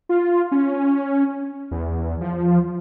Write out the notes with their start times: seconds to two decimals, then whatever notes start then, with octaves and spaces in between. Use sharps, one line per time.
0.09 F4
0.52 C#4
1.71 E2
2.21 F3